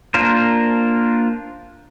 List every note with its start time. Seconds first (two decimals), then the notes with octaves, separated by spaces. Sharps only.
0.14 A#3 D4 F4 A#4 C5